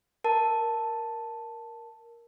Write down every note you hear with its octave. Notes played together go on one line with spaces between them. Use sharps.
A#4 A5